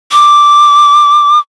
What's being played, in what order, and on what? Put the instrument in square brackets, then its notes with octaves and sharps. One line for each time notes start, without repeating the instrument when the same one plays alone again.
[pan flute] D6